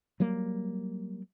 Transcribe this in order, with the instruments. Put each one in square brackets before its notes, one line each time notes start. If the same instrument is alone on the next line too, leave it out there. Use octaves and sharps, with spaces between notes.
[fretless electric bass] F#3 G3 A#3